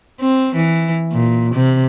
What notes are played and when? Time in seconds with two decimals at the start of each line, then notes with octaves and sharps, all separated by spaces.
0.20 C4
0.56 E3
1.12 A#2
1.55 C3